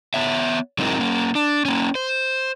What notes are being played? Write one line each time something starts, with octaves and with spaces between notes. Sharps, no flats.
B3 C#5 E5
F#3 G#3 C4 D#4 E4 A#4
A#3 C#4
D4
A#3 C#4
C5